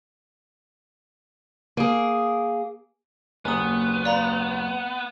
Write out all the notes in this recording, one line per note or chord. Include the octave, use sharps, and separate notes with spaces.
A#3 G#4
F#1 D#2 B3 C5 G#5 A#5 D#6
D5 F5 A#5 B5